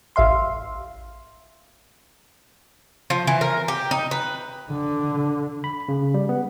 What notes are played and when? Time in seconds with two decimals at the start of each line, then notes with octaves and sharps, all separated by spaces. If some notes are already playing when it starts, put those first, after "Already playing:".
0.16 A1 E5 F5 C6
3.10 F3
3.27 E3
3.41 A#4
3.68 G4
3.91 D#4
4.11 B4
4.71 D3
5.64 B5
5.88 C#3
6.14 G3
6.29 B3